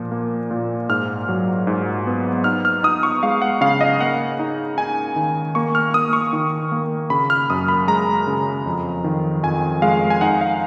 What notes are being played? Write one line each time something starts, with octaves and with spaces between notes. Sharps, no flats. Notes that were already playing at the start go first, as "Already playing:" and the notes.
Already playing: A#2 F3
A#3
A#2
G#2 F6
F#3
G#2
B3
D#4 F6
F6
D#4 D#6
C#6
G#3 F5
F#5
C#3 F5
D#5
A#3 F#5
D#4
D#4 G#5
D#3
A#3 C#6
F6
A#3 D#6
C#6
D#3
A#3
C#3 B5
F6
F#2 D#6
B5
G#3 A#5
C#3
F2
D#3
F2 G#5
G#3 F5
G#5
D#4 F#5
F5